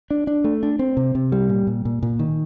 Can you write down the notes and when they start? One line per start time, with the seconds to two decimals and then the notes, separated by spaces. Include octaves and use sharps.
0.11 D4
0.27 D4
0.44 A3
0.63 D4
0.79 C4
0.97 C3
1.15 C3
1.32 G3
1.49 A#2
1.67 A#2
1.85 A#2
2.03 A#2
2.19 D#3